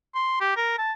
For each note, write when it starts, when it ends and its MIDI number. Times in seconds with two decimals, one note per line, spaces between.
0.15 0.36 84
0.41 0.53 67
0.57 0.74 70
0.78 0.92 81